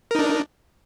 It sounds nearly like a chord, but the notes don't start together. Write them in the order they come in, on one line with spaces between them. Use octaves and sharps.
A#4 D#4 D4